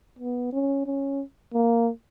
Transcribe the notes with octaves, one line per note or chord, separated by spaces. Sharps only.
B3
C#4
C#4
A#3